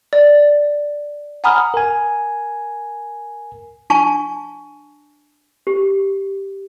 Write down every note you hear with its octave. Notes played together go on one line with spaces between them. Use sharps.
D5
F#5 G#5 A#5 B5 D#6 F6
A#4 G#5
D4 G#5 A5 C#6
G4